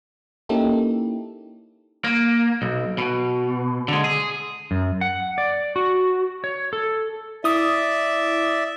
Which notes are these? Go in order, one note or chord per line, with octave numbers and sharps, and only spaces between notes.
A#3 C#4 D#4 E4 G4 A4
A#3
B1
B2
D3 G#3
G#4
F#2
F#5
D5
F#4
C#5
A4
E4 D5 E5 D#6